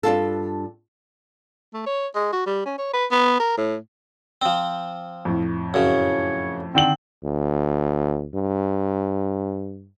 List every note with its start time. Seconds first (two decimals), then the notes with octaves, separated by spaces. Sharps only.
0.03 G2 D4 F4 A4
1.74 A3
1.86 C#5
2.15 G#3
2.33 F#4
2.47 G3
2.66 C#4
2.78 C#5
2.94 B4
3.12 B3
3.40 A#4
3.58 A2
4.42 F3 C4
5.25 F2 A2
5.74 F#2 C#3 C#5
6.75 D3 D#3 C4 F#7
7.24 D2
8.35 G2